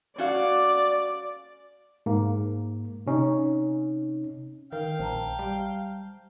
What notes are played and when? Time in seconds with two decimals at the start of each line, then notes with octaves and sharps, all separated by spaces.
0.18 C#4 F#4 D5 F5
2.06 G#2 A#3
3.06 C3 C#4 D#4
4.72 D#3 A#4 F5 G5
4.99 A#1 C5 A5 A#5
5.39 G3